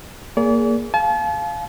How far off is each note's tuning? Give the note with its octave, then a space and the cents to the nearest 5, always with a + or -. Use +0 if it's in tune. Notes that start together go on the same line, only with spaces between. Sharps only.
A#3 +0 G#4 +0 D5 -40
F5 +0 A5 -40